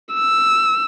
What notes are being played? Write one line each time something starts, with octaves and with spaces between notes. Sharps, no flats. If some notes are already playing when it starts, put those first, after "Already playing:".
E6